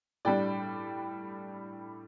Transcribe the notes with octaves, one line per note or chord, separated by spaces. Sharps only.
A2 G3 D4 D5 G5